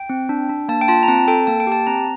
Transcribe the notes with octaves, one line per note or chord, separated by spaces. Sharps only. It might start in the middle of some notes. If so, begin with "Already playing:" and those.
Already playing: G5
C4
D4
D4
A#3 A5
G5
F4 A5
A#5
C4 A5
A4 G5
A#3 A5
G5
G4 A5
C4 A#5